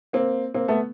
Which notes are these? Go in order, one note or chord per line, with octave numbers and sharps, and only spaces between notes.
A#3 C4
A#3 C4
A3 B3